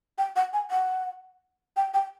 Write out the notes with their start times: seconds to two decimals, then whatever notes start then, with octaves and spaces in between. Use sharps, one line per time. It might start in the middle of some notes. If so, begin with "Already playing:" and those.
0.18 G5
0.36 F#5
0.53 G#5
0.71 F#5
1.77 G5
1.94 G5